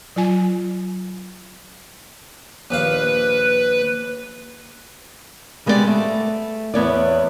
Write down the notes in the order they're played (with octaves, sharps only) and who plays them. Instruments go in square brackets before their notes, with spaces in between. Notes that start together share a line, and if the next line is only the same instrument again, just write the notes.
[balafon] F#3 F4 G#5
[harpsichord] A#1 D#2 F5 [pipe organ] B4
[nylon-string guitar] G3 G#3 B3 G4 G#4 D5
A3
E2 B3 C#5 D5